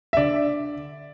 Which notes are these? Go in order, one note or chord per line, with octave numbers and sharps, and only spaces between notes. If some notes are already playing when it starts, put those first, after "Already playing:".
E5
D3 D5